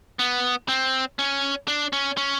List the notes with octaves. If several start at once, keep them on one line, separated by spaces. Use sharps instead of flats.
B3
C4
C#4
D4
C#4
C#4